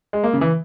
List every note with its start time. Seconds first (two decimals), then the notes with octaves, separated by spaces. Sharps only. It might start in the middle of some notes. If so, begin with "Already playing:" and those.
0.13 G#3
0.24 A#3
0.33 C#3
0.41 E3